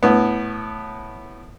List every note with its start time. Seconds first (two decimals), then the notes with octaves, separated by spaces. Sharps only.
0.03 A2 B3